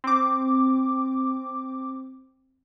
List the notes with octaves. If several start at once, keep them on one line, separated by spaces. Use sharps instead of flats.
C4 D6